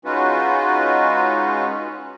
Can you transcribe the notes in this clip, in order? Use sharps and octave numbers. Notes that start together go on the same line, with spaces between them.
G#3 C#4 D#4 F4 F#4 B4